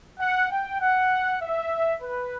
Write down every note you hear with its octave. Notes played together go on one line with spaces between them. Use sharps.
F#5
G5
F#5
E5
B4